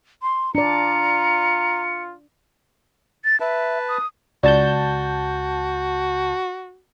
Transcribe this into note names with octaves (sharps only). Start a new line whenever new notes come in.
C6
D4 F4 D5 A#5 C#7
A6
B4 E5 A5
D#6
C#2 F#4 D5 A5 G6